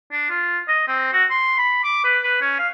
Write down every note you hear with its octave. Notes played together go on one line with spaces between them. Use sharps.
D4
F4
D#5
C4
F#4
C6
B5
D6
B4
B4
C#4
F5